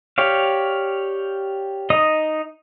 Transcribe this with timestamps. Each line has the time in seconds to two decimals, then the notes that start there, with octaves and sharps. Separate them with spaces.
0.18 G4 C#5 D5 F5
1.90 D#4 D#5 D#6